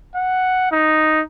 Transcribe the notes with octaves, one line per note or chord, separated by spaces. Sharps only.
F#5
D#4